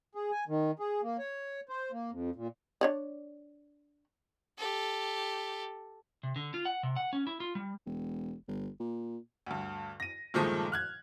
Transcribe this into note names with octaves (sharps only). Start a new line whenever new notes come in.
G#4
G#5
D#3
G#4
A#3
C#5
C5
A#3
F2
A#2
D4 C#5 D5
G4 A4
C3
D3
F4
F#5
C3
F#5
C#4
E4
F4
G3
E1
G1
A#2
D2 G2
A#6 D#7
G2 A#2 D#3 F3 G#3 A3
F6 F#6 G#6